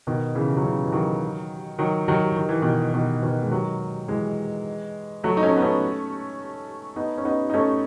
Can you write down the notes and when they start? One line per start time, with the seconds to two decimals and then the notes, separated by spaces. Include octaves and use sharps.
0.07 B2 D#3
0.35 C#3 E3
0.57 F#3
0.64 C#3 E3
0.85 E3
0.92 D#3 F#3
1.79 D#3 F#3
2.08 D#3 F#3
2.37 D#3
2.49 E3
2.62 B2 D#3
2.94 B2 D#3
3.23 B2 D#3
3.43 G#3
3.51 D#3 F#3
4.08 E3 G#3
5.24 F#3 A3
5.37 D#4
5.43 A3 C#4
5.57 B3
5.62 A3 C#4
6.96 B3 D#4
7.18 C#4
7.25 B3 D#4
7.50 D#4
7.54 A3 C#4